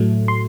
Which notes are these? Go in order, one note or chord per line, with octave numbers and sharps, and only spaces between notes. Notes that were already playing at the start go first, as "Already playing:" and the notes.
Already playing: A2 F#3 A3
C6